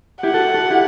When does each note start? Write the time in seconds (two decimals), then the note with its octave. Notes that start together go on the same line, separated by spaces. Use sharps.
0.23 E4 G4 F#5
0.34 F#4 A4
0.54 F#4 A4
0.70 E4 G4